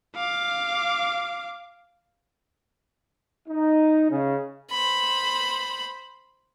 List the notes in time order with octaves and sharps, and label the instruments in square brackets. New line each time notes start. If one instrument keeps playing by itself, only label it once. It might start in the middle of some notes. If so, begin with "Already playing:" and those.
[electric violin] F5 D6
[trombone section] D#4
C#3
[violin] C5 B5